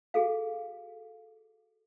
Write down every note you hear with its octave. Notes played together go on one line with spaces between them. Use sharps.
F#4 G#4 A4 F5